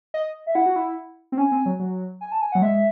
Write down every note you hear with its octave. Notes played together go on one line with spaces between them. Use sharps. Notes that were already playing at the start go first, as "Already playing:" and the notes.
D#5
E5
E4 F#5
F#4
E4
C4
C#4 G#5
C4
F#3
F#3
G#5
A5
G#5
F#5
F#3
G#3 E5